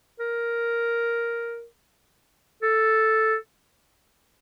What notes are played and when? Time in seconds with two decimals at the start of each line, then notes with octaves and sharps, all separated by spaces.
0.20 A#4
2.62 A4